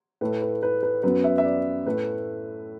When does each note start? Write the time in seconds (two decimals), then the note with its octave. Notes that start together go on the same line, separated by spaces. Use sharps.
0.21 A2 A3 B4
0.42 B4
0.63 B4
0.83 B4
1.03 F#2 F#3 B3 B4
1.24 E5
1.38 E5
1.45 D5
1.86 A2 A3 B4